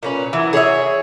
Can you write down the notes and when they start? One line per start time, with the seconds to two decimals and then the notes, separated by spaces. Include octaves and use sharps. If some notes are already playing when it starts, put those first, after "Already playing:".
0.03 A#2 C#4 B4
0.33 E3 F#3
0.53 G#4 C#5 D#5 E5